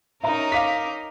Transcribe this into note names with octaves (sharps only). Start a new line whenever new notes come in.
C#4 D#4 A#4 E5 A#5
F5 D6 B6